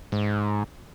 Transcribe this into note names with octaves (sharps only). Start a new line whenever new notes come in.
G#2